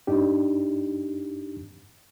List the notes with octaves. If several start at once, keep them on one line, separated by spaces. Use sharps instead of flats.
G2 D4 D#4 G4